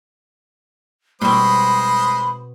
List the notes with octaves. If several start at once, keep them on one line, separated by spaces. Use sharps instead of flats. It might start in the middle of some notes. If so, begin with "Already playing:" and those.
B2 G3 G#3 C4 C5 B5 D#6